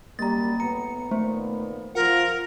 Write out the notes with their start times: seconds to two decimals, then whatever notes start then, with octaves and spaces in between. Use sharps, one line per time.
0.19 F#2 F#3 G3 A#3 A#5 A6
0.60 A2 B3 A#5 C#7
1.11 A#2 D#3 A3 B3 C5
1.95 F3 F4 A#4 F#5